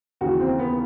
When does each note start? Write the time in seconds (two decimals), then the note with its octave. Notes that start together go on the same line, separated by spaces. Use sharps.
0.21 D#2 C#3 E3 F#4
0.40 C4
0.59 B3